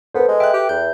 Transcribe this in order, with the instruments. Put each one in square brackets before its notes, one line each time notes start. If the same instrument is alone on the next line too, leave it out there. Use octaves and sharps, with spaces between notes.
[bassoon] B3 [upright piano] A4 B4 [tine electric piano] C5
[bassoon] G#3
[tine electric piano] E5 [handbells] G5 F#6
[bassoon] G4
[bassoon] E2 [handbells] G6